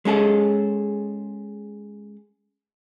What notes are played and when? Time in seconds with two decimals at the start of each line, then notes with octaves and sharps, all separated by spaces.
0.05 G#3 C#4 G#4 A4